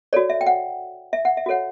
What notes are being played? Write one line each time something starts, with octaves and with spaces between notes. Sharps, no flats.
F#4 A4 C#5 D5
E5
G5
F#5
E5
F#5
E5
F#4 A4 C#5 F#5